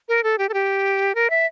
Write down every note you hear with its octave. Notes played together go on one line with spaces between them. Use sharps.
A#4
A4
G4
A4
G4
A#4
E5